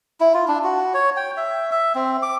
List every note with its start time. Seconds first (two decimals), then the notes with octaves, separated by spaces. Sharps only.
0.20 E4
0.34 F4
0.48 D4
0.64 F#4
0.94 C#5
1.17 G5
1.37 E5
1.71 E5
1.95 C4
2.23 D6